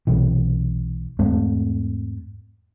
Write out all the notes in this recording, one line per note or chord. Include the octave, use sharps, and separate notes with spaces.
B1 C3 E3
E2 G#2 A3 C4